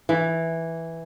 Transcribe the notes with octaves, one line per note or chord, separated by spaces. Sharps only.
E3